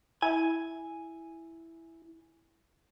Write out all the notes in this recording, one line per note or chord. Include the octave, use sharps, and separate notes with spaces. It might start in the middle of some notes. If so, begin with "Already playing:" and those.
E4 G#5